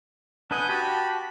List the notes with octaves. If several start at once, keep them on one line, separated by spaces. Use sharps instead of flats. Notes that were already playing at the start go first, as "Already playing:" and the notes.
D4 B4 D#5 F#5 G#5 G6
F#4 G4 A5 B5